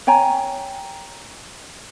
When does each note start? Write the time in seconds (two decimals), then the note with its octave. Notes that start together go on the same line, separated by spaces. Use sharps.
0.07 C#5 G5 G#5 A#5